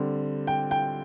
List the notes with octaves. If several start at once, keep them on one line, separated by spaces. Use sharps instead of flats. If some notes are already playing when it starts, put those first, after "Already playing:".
Already playing: D3 G3 C4
G5
G5